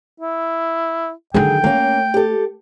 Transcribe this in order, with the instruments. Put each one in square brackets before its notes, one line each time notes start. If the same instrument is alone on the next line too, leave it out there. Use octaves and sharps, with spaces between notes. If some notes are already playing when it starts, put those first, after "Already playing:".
[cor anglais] E4
[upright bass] D3 D#3 [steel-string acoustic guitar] F#3 G#4 [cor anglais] G5
[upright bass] A3 [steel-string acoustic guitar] A#3 C#4
[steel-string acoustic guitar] G4 A4